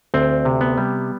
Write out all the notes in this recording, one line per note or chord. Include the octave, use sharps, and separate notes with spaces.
D2 C4
C3
B3
G3